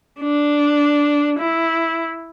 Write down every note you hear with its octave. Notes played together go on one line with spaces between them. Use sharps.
D4
E4